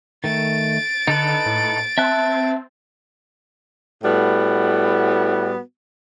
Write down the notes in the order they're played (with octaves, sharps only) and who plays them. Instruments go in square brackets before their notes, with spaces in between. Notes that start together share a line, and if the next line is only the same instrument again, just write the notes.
[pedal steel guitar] D#3 A3 [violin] A6 D7
[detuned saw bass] D3 [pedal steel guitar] D#4 A4 B4
[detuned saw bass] A2
[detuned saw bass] C4 [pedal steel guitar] E5 A5 F#6
[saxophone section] A2 G3 B3 F#4 F#5